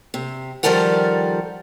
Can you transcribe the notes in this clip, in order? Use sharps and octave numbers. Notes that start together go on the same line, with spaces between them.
C3
D#3 F3 G3 A4 A#4 F#5